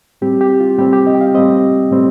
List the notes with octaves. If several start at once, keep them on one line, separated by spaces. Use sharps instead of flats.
A2 G3 C4 G4
G4
F4
A2 G3 C4 G4
G4
D#5
G5
F5
A2 G3 C4 D#5
A2 G3 C4